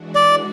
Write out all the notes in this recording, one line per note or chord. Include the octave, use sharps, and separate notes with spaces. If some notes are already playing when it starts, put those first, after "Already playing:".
Already playing: E3 G#3 D4 F#4
D5